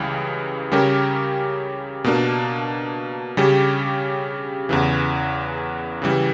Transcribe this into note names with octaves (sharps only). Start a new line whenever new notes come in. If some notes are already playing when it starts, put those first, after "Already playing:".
Already playing: C#2 C#3 E3 G3
C#3 G3 C#4 G4 A#4
B2 A#3 D4
C#3 G3 C#4 G4
E2 C#3 E3
C#3 E3 G3